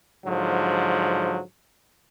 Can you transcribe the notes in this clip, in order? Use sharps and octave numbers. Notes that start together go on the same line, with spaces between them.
G#2 D3 F3 F#3